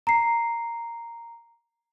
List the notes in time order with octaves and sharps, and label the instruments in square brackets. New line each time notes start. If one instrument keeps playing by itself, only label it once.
[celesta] A#5 C7